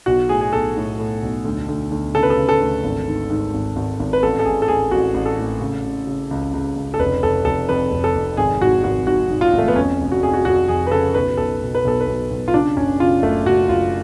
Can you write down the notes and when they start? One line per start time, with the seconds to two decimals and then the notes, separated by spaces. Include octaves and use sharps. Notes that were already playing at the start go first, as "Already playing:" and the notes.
0.06 B1 F#4
0.29 A2 G#4
0.41 G#4
0.53 B1 A4
0.77 A2
0.98 A2
1.23 B1
1.45 D2
1.68 D2
1.92 D2
2.15 C#3 A4
2.23 B4
2.30 A4
2.37 C#3
2.49 A4
2.60 D2
2.84 G#1
3.07 G#2
3.30 G#2
3.54 G#1
3.76 G#1
4.00 G#1
4.13 B4
4.23 A1 A4
4.39 A4
4.45 A1 G#4
4.62 A4
4.68 A1 G#4
4.91 A1 F#4
5.14 A1
5.26 A4
5.38 A2
5.61 C#3
5.85 C#3
6.07 C#3
6.31 C#2
6.53 C#2
6.76 C#2
6.94 A4
6.99 F1 B4
7.23 F1 A4
7.45 F1 A4
7.69 F2 B4
7.91 F1
8.04 A4
8.15 F1
8.37 G#1 G#4
8.61 G#2 F#4
8.84 G#1 F#4
9.07 G#2 F#4
9.30 G#2
9.41 F4
9.53 G#1
9.58 A3
9.68 B3
9.76 F2 C#4
10.00 F1
10.12 F#4
10.23 F2 G#4
10.34 F#4
10.45 F2 F#4
10.68 F2 G#4
10.87 B4
10.91 C#3 A4
11.14 B1 B4
11.37 B1 A4
11.61 B2
11.75 B4
11.85 B1 A4
12.01 B4
12.07 B1
12.31 B1
12.48 F4
12.54 C#3 D4
12.77 F#1 C#4
13.00 C#3 F4
13.22 F#1 A3
13.45 F#1 F#4
13.69 F#1 F4